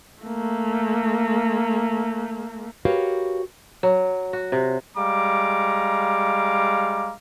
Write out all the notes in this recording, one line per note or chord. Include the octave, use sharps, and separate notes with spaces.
A3 A#3
F#4 G4 A#4 B4 C#5 F5
F#3
F#4
C3
G3 G#3 F5 A#5 D6